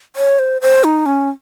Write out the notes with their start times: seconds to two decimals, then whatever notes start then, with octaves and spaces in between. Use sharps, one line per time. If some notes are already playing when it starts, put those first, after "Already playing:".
0.16 C#5
0.39 C5
0.61 C5
0.84 D#4
1.06 C#4